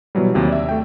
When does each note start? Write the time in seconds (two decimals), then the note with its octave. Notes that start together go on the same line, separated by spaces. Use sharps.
0.15 B2 E3 F#3 G3
0.34 D#2 C3 F#3
0.49 D5 E5
0.69 A3 G5